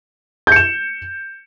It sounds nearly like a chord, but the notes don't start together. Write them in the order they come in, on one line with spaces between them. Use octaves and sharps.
G6 C#7 E7